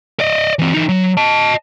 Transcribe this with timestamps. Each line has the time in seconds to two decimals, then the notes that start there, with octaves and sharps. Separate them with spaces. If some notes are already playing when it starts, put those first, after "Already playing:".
0.20 D5 D#5
0.59 E3 C4
0.74 E3 D#4
0.89 F#3
1.17 D#5 A5